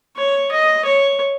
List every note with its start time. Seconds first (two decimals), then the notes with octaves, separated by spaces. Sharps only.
0.17 C#5
0.51 D#5
0.85 C#5